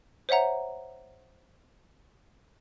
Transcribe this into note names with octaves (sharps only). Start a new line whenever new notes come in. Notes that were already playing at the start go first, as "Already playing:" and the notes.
C5 C#5 E5 F#5 A#5